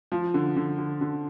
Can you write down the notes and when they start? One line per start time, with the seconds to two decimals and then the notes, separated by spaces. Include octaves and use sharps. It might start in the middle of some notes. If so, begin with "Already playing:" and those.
0.12 F3
0.34 D3
0.56 D3
0.78 D3
1.01 D3